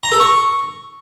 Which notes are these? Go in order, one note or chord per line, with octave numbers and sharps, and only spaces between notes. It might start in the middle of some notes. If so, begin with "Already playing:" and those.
A#5
A4
C#6